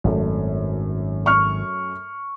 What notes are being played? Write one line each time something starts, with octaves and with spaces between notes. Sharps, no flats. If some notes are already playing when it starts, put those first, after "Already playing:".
G#1 F#2 A3
C#6 F6